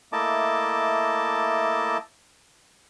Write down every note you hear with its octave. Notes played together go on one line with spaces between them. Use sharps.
A3 A#3 E4 D#5 A5 D6